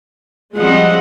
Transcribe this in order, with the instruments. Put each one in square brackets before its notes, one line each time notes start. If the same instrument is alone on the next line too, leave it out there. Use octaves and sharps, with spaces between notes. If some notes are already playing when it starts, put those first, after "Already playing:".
[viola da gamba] F3 G3 C4 [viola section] G#3 D#5 F#5